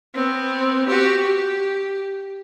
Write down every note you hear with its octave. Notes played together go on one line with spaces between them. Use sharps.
B3 C4
F#4 G4
G4